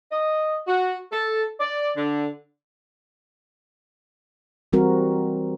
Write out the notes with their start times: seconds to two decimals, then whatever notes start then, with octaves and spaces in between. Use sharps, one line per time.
0.11 D#5
0.67 F#4
1.12 A4
1.60 D5
1.97 D3
4.73 E3 G3 C4 F#4 A#4